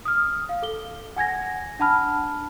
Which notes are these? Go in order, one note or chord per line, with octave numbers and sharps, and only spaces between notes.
D#6 F6
F5
A4 G7
F#5 G#5 G#6 A#6
D4 F#5 A5 B5 F6